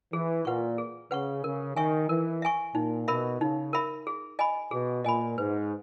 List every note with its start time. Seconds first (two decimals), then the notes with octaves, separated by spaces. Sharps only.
0.13 E3 G#4
0.45 A#2 B4 F#5 C#6
0.78 G#4
1.11 C#3 B4 F#5 C#6
1.44 C#3 A#4
1.76 D#3 E5 G#5 C#6
2.09 E3 A#4
2.42 E5 G#5 C#6
2.74 A#2 D#4
3.08 B2 A#4 E5 B5
3.41 C#3 D#4
3.73 A#4 E5 B5
4.07 G#4
4.39 D#5 G#5 B5
4.71 B2 G#4
5.04 A#2 D#5 G#5 B5
5.38 G#2 B4